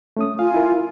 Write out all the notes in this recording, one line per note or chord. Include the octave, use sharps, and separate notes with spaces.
A3 C#4 D#6
F4 F5 G#5
E4 A#4